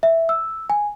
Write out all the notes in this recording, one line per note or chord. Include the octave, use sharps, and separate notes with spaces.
E5
E6
G#5